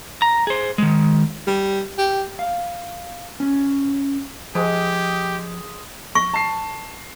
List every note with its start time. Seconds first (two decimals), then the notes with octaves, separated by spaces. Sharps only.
0.22 A#5
0.47 G#4 C5
0.78 D#3 G#3
1.47 G3
1.98 G4
2.39 F5
3.40 C#4
4.55 F3 G#3 G4
6.15 C#6 A#6
6.34 A5 C7